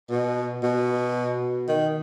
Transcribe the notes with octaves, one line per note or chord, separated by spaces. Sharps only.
B2
B2
D#3